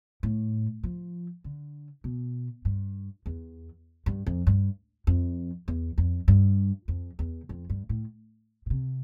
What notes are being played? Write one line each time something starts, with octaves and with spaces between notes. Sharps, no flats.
A2
F3
D3
B2
G2
E2
G2
F2
G2
F2
E2
F2
G2
F2
E2
F2
G2
A2
B2
C3